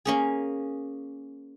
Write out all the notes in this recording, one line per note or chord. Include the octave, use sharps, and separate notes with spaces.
A#3 C#4 G#4